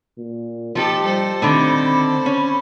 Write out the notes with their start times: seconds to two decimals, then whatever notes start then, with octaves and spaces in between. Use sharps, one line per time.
0.18 A#2
0.75 F3 D#4 F4 G4 A4 A5
1.04 G3 A4 C5
1.42 D3 D#3 A3 C4 B5
1.85 B5
2.26 C#4